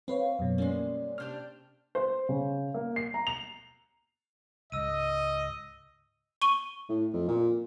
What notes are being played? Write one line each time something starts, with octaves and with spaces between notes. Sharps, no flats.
C4 B4 C#5 F5
F#2 B2
G3 G#3 A#3 C#4
C3 D4 G4 F6 G6
C5
C#3
A#3
C7
A#5
F7
C#2 G#2 D#5 E6 D#7
C#6 D#7 G7
A2
F2
A#2